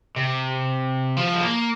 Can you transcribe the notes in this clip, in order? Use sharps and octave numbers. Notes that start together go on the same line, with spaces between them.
C3
F3
G#3
A#3